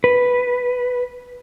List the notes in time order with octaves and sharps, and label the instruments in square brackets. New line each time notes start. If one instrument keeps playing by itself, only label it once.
[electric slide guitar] B4